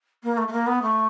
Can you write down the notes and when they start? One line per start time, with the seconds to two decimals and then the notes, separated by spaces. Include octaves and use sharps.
0.23 A#3
0.37 A3
0.47 A3
0.52 A#3
0.66 B3
0.82 A3